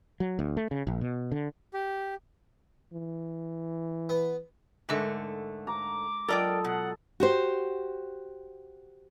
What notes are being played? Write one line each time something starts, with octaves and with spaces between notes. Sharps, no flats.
F#3
D2
A3
C#3
A#1
B2
D3
G4
E3
B3
G#2 D3 G#3 A3 D4 A#4
A#5 D6
F#3 F4 A4 A#4 D5 D#5 G5
B2 F#5
F#4 G4 C5